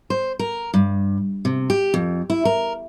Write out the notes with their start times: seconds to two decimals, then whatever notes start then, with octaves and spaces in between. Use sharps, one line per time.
0.10 C5
0.39 A#4
0.74 G2
1.45 C3
1.70 G4
1.94 F2
2.30 E4
2.45 A#4